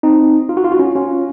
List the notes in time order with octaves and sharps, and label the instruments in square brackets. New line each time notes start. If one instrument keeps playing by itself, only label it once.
[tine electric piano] C4 D#4
F4
F#4
F4
F#4
C#4 F4
C#4 F4